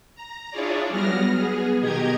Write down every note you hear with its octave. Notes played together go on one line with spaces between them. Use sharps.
A#5
D4 E4 F4 G#4 C#5 D5
F#3 G3 B3 F6 A#6
B3 G#4
B2 D#3 G4 D#5 A#5 G#6